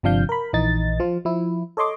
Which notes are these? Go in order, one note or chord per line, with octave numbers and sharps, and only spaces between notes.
G1 C3 F3 D4 F5 G6
A#4 B5
A#1 E3 D#4 A6
F3 F4
F3 E4
A4 C#5 D#5 C6 D6